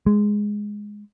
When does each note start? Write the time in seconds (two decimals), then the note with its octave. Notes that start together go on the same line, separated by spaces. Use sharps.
0.06 G#3